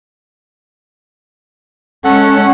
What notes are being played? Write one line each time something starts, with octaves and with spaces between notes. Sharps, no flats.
G#3 C#4 A4 F#5